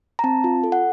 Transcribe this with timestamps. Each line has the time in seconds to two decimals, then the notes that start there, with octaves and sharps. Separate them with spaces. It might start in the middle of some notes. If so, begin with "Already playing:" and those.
0.19 A#5
0.24 C4 A5
0.44 F4
0.64 A4
0.72 F#5